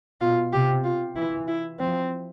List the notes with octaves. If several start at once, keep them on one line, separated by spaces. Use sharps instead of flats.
B2 F4
C3 G4
F4
E3 E4
E4
F3 C4